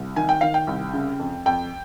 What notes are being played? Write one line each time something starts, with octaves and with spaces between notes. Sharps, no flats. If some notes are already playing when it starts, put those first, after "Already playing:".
Already playing: C2
D#3 G#5
G5
D#3 F5
G5
C2
C#3
F2
F2 G5